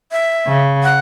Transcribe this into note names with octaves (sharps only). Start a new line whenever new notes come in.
E5
C#3
F#5